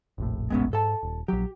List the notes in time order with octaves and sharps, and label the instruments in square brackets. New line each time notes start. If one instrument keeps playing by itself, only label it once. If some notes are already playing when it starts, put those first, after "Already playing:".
[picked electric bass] F1 A#1 A2
[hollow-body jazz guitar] G#3 B3 C#4
[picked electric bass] G#2 [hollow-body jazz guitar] A4 A5
[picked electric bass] D#1
[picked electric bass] A#1 F#3 [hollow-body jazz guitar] G4